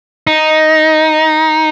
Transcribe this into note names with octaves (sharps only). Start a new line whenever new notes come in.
D#4